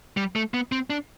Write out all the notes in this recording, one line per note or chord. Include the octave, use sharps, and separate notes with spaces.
G3
A3
B3
C4
D4